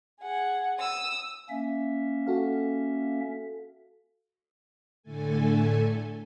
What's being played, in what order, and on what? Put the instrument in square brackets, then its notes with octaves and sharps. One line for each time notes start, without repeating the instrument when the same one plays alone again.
[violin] G#4 F#5
D#6 E6
[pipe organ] A#3 C#4 E5
[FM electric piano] F#4 A4 F5
[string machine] A2 D3 A3 A4 G#5